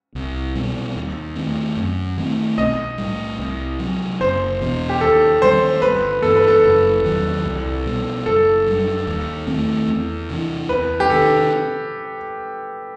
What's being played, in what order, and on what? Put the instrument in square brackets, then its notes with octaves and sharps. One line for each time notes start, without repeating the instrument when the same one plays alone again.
[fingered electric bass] C2
B2 G3 C4
D#2
D#3 A3 C4
F#2
D#3 A3 C4
[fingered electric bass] B1 [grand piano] D#5
[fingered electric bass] A2 G3
C2
C3 F#3
[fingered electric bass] F#1 [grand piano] C5
[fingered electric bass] E2 B2
[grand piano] G4
[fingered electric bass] D#2 [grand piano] A4
[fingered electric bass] D#3 G3 C4 [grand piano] C5
[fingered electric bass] G1 [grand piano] B4
[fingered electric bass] G2 E3 B3 [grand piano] A4
[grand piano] B4
A4
[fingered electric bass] F#1
E2 D#3 F#3
C2
B2 G3
[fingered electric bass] F#1 [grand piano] A4
[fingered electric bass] F#2 D#3 G3
D#2
D#3 A3 C4
E2
C3 E3
[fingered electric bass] E2 [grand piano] B4
[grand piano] G4
[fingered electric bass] C3 D#3 [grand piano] A4